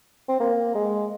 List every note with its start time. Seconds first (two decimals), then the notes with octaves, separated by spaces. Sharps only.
0.29 C4
0.40 A#3
0.75 G#3